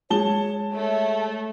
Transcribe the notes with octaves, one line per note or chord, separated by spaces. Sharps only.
G#3 C#5 A5 G7
A3 C#5